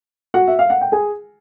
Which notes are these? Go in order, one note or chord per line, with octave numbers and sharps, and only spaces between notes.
F#4 F#5
E5
F5
F#5
G5
G#4 G#5